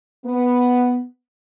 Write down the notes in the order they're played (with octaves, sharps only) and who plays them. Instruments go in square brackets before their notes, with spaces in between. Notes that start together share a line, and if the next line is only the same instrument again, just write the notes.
[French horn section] B3